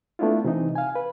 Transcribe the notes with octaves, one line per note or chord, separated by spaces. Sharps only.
A3 B3 D4 E4 F4
C3 E3 D#4
F5 G#5
B4